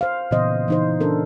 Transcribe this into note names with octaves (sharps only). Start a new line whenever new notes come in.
C5 F5
A#2 C#3 E3 B3 C5 D#5
E3 D#4 C5
C#4 D4 A4 A#4